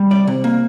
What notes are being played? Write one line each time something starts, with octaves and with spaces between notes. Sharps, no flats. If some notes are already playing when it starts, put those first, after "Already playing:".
Already playing: G3
C2 D5
C3
A#3